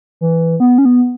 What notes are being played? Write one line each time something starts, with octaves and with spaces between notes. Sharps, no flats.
E3
B3
C#4
B3